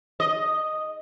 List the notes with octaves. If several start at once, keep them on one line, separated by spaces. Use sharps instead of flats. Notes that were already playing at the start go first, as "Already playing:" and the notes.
D#5